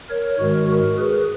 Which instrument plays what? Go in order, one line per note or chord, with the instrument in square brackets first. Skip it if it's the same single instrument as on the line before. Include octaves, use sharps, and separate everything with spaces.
[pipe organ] A#4 C#5
G#2 D#3 G#3 F#4 A#4
F#4 A#4
G#4 B4